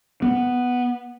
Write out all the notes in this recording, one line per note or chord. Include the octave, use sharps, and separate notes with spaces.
B3